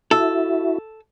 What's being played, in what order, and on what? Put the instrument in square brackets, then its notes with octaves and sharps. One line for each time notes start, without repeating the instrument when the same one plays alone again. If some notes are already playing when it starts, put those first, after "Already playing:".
[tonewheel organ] E4 F#4 E5 [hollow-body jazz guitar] A4